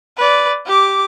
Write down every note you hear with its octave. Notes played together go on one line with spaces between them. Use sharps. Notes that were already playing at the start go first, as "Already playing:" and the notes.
B4 D5
G4 D6